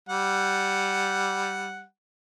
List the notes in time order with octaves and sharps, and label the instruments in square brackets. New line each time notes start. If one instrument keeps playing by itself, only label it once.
[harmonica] G3 F#5